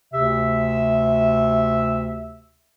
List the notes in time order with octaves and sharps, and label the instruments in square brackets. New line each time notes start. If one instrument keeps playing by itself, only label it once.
[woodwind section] D2 C3 E5